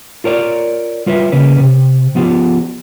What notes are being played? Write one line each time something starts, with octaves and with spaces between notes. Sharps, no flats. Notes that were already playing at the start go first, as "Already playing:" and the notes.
F4 A#4 C#5 D5
G3 F4 B4 C#5 E5
C#3 A#3 C#4 B4
C3
F3 B3 F4 G4